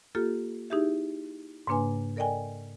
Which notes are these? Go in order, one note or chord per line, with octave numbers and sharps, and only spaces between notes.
A#3 F4 G4 A4
D#4 E4 G4 G#4 E5
G#2 C#3 A#3 D4 B4 G#5
A4 A#4 D5 D#5 G5 G#5